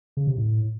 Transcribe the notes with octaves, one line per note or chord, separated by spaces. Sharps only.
C#3
C3
A2